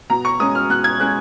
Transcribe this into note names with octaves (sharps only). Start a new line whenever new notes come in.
B2 A#5
C#6
G#3 C#4 D#6
F6
B2 F#6
G#6
G#3 C#4 F#6